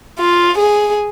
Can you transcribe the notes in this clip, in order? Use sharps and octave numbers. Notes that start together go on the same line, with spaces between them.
F4
G#4